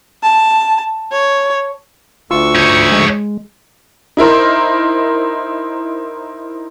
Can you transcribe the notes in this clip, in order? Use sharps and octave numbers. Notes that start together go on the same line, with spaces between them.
A5
C#5
D2 F4 C#6 E6
D#4 C#5
G#3
D#4 E4 A#4 C5